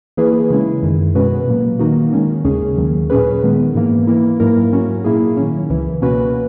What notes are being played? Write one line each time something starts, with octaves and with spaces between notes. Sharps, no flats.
E3 A#3 E4 G#4 B4
C#3 E3 G#3 C#4 E4
F#2 D#3 G#3
B2 G#3 C#4 F#4 B4
A#2 F#3 A#3
D#3 A#3 D#4 F#4
D#3 G#3 C#4
D#2 C#3 G#3 C#4 G#4
D#2 D#3 F#3
A#2 F#3 C#4 G#4 B4
D#3 G#3 B3
G#2 E3 A#3
E3 A#3 E4
G#2 F#3 A#3 E4 A#4
G#2 F#3 C#4 F#4
A#2 A#3 E4 G#4
D#3 F#3 C#4
C#2 C#3 E3
B2 A#3 C#4 F#4 B4